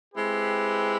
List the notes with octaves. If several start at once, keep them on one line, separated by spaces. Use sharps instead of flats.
G#3 C4 E4 G4 B4